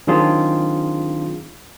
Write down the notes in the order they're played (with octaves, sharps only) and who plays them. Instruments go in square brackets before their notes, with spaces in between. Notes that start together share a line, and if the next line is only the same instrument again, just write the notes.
[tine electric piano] D#3 F#3 C4 D4 F4 G#4